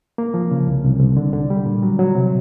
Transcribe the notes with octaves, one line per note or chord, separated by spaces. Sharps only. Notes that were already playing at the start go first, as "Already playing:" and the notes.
A#3
F3
C#3
C2
C2
C2
D3
D3
G3
A#2
F#3
F#3
C3